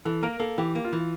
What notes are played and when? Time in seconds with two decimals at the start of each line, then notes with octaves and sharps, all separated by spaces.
0.05 E3 A4
0.23 A#3 A#4
0.40 A#3 A4
0.58 E3 G4
0.75 A#3
0.84 F4
0.93 E3